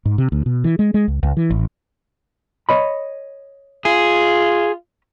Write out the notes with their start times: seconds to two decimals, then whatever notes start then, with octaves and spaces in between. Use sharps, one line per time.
0.05 G#2
0.18 C3
0.32 D2
0.46 B2
0.64 E3
0.79 G#3
0.94 G#3
1.08 C#2
1.23 C#2
1.37 E3
1.50 A1
2.69 C#5 D#5 B5
3.85 F4 G#4